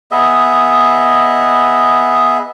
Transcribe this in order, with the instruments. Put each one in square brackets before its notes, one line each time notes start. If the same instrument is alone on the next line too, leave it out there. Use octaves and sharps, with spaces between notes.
[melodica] B3 G#4 D#5 E5